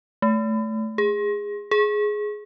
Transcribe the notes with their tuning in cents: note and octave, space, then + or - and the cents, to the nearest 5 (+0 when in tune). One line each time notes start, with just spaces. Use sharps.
A3 -10
G#4 -20
G#4 +10